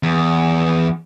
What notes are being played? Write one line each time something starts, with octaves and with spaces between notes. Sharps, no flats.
E2